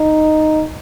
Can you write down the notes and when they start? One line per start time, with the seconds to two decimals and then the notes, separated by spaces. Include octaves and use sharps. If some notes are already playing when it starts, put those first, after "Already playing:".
Already playing: D#4